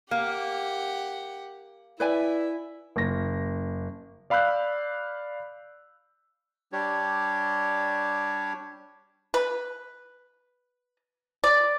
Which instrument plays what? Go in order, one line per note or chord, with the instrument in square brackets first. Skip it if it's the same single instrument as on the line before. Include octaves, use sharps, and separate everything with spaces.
[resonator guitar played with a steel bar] A#3 [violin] G4 F#5
[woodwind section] E4 [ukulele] B4 D5 G#5 [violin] E5
[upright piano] F#1 A#6
[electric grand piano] D5 F5 B5 E6 F#6 G6
[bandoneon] G3 D4 G4 C#5
[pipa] B4
D5